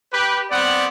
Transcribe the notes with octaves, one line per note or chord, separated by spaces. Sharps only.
G4 B4
G3 B3 C4 D5 F#5